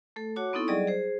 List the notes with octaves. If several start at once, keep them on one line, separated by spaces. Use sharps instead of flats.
A3 A4
F#4 C#5 F#5 A5 D6
B3 C4 D#4 E4 A4 C#6
F#3 G3 G#4 D5 D#5
G#4 C5